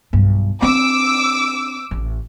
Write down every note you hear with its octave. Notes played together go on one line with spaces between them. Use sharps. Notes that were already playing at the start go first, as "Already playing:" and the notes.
B1 G2
C4 D4 D6 E6
A1